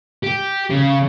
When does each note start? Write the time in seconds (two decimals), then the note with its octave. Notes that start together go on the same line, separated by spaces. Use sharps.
0.24 G4
0.71 C#3